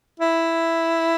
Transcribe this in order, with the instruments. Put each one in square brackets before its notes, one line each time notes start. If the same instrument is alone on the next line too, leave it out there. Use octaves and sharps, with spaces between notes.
[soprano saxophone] E4